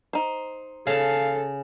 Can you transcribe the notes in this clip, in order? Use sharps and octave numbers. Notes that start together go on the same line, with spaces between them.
D#4 C5
C#3 A4 F5 A5